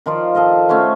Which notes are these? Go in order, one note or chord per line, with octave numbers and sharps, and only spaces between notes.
D#3 F3 F4 D5
A4 D#5 F5 A5
A3 C#4 F#4 C5